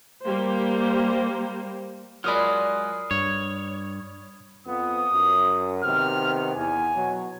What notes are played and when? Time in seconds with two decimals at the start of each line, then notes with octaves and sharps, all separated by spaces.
0.24 G3 A#3 G4 C5
2.24 F#3 G#3 F4 A#4 D5 B5 D#6 F6
3.11 G2 C#5
4.67 F2 F3 B3 D#6
5.12 F#2
5.84 C3 D#3 B3 F6
6.55 E2 G#5
6.95 B2 F#3